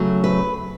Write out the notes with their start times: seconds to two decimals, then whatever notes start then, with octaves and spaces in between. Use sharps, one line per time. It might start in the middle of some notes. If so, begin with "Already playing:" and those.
Already playing: C#3 F#3 A3
0.24 B4